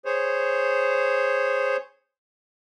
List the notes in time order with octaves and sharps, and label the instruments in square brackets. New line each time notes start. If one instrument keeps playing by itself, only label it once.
[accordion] G#4 C5 C#5